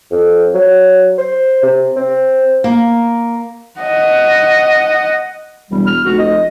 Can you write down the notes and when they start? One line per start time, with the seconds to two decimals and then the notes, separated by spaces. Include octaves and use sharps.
0.11 F2
0.54 F#3
1.18 C5
1.63 C3
1.96 C4
2.64 A#3
3.80 D#5 F#5
5.71 E1 G3
5.87 F6
6.05 F1 F#4
6.19 D#5